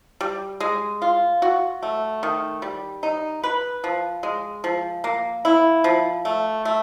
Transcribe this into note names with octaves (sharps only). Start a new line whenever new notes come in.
G3
G#3
F4
F#4
A3
D#3
G3
D#4
B4
F3
G#3
F3
A#3
E4
F3
A3
A3